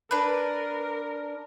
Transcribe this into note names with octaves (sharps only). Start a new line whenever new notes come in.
D4 A#4 B4